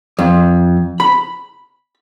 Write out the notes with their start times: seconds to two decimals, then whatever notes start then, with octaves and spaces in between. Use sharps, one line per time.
0.19 F2
1.00 B5